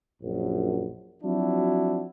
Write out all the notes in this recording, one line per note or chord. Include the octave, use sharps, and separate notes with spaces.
A#1 F#2
F3 F#3 C4 D4 E4 F#4